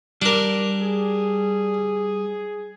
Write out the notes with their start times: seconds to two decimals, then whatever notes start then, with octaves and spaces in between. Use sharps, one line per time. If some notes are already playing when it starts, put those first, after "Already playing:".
0.22 G3 D4 A#4
0.80 G#4